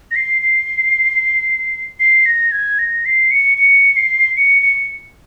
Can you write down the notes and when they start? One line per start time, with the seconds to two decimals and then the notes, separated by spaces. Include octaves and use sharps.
0.11 A#6
0.16 C7
0.42 C7
2.00 C7
2.26 A#6
2.52 G#6
2.79 A#6
3.05 C7
3.31 C#7
3.58 C#7
3.96 C7
4.37 C#7
4.62 C#7